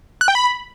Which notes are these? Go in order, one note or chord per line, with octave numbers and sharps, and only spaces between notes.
F#6
G5
B5